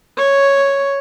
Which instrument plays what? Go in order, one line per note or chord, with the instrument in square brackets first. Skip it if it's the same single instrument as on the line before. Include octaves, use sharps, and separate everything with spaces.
[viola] C#5